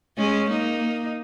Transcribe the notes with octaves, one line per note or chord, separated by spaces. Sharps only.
G#3 C#4
A#3 D#4